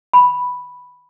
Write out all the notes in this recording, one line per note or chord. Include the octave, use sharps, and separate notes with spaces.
B5